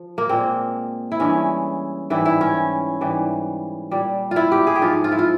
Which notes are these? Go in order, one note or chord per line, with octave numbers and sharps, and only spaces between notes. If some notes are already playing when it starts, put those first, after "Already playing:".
Already playing: F3
A#3
A#2 G#3 C4
E4
G2 E3 G#3 C#4
G#2 E3 G3 E4
E4
C#4
G#2 E3 G3
A#2 G3
E4 F4
G4
G#4
G4
G#2 F3 G#3 F4
F4
E4
F4